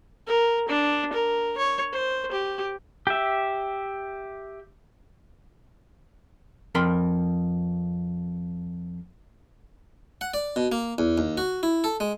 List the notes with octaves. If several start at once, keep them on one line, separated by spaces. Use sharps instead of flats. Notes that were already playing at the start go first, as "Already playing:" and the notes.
A#4
D4
A#4
C#5
C5
G4
G4 E5
F2 A#4 A5 B5 C6
F#5
D5
B2
A#3
E2
D#2
F#4
E4
A4
G#3